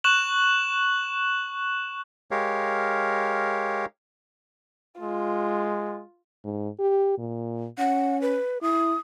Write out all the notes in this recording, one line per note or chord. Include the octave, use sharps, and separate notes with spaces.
C#6 F#6 E7 F#7
G#3 G4 A#4 C#5 F5
G#3 F4
G#2
G4
A#2
C#4 F#5
B4
E4 D#6